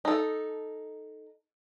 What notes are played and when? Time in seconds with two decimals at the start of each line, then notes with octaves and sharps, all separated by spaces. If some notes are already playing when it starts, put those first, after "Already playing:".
0.05 D#4 A4